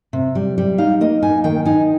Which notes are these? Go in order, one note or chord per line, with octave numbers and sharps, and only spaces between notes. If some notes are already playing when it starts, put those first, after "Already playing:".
C3
G3
G3
D#4 F5
A#3 D#5
D#4 G#5
D#3 G5
D#4 G#5